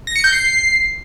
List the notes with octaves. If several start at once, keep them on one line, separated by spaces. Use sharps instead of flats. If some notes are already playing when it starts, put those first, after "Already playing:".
A#6
C#7
G6
C7